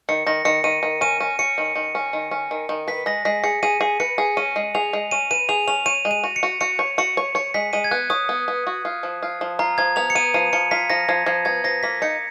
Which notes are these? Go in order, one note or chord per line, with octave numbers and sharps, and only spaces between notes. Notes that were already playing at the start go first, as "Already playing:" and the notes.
D#3 C#7
D#3 A#6
D#3 C#7
D#3 D#7
D#3
C#4 D#7
C#4
C#4 C#7
D#3
D#3
C#4
D#3
C#4
D#3
D#3
B4 B6
G#3 A#6
G#3 B6
G#4 C#7
G#4 D#7
G#4
B4 C#7
G#4
C#4 D#7
G#3
G#4 F7
G#3
C#4 D#7
B4 D#7
G#4 F7
C#4 F7
C#5 D#7
G#3
D#7
F#4
C#7
F#4
F#4 C#7
C#5
F#4 C#7
C#5
C#5 C#7
G#3 B6
G#3 D#7
G#6
B3 F#6
C#5 D#6
B3
B3
F#4
F4
F3
F4
F3
F4 A#5
F3 G#6
B3 F7
C#7
B3 D#7
F3 D#7
F3 C#7
F4 B6
F3 A#6
F3 G#6
F3 G#6
B3 G#6
F3 A#6
A#3 B6
D#4 C#7